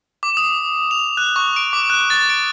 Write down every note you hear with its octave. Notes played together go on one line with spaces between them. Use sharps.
D6
D#6
F7
F#6
C#6
D7
D6
F#6
A6
D7